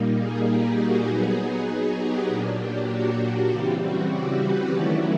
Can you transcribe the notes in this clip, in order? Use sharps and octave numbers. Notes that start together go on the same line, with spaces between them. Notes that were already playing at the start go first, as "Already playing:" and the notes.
Already playing: A#2 G3 A#3 D#4
G#4
G4
F#4
F#3 B3 D#4 G#4
G4
A#2 F#3 A#3 D4
G4
F#4
G4
C#3 E3 G3 C4 G4
F#4
G4
B4
D#3 F#3 A3 C#4 E4 D5